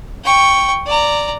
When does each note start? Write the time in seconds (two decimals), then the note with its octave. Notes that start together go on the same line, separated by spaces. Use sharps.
0.24 G5 C#6
0.86 D5 A#5